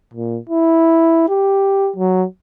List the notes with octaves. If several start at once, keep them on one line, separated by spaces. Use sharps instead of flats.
A#2
E4
G4
F#3